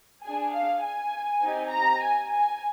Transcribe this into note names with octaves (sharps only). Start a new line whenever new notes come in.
D4 G#4 G#5
F5
G#5
C4 D#4 G4
A#5
G#5
G#5